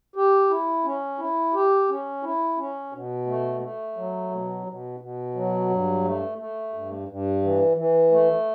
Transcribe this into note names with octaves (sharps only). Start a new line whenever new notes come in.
G4
E4
C#4
E4
G4
C#4
E4
C#4
B2
A3
A3
F#3
B2
B2
B2
F#3
G2
A3
A3
G2
G2
E3
E3
A3